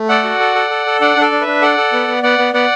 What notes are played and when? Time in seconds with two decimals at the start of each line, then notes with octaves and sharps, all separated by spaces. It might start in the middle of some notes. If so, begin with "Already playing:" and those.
Already playing: A3
0.09 A4 D5 F#5
0.24 F#4
0.40 A4
0.55 A4
0.70 A4
0.86 A4
1.01 D4 D5 F#5
1.16 D4
1.21 A4 D5
1.32 D4
1.41 B4 E5
1.47 D4
1.62 A4 D5 F#5
1.77 A4
1.93 B3
2.08 B3
2.23 B3 D5 F#5
2.39 B3
2.54 B3 D5 F#5